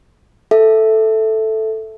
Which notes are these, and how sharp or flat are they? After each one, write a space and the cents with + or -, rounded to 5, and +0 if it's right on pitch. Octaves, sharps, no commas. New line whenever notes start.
A4 +0 E5 +0